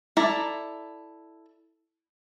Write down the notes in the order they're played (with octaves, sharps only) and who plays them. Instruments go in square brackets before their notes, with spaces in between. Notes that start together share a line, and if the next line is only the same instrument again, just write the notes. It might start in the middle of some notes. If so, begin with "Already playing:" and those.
[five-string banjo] E4 A4 D5 A#5